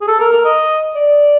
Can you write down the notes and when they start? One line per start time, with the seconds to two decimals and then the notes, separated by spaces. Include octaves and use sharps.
0.01 G#4
0.08 A4
0.20 A#4
0.33 A#4
0.45 D#5
0.95 D5